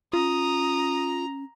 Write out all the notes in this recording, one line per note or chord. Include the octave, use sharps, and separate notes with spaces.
C#4 F4 A#5 D#6